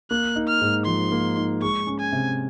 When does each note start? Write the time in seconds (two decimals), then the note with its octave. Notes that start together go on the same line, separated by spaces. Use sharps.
0.11 A#3 F#6
0.36 D#4
0.48 F6
0.61 G#2
0.86 F3 C6
1.12 A#3
1.37 D#4
1.62 G#3 C#6
1.87 C#4
2.00 G#5
2.12 C3